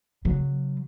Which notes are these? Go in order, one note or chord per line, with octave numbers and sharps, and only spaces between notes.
C#3 F#3